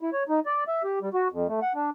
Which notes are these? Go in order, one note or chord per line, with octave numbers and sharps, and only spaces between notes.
E4
C#5
D#4
D5
E5
G4
G3
F#4
F2
A3
F#5
D4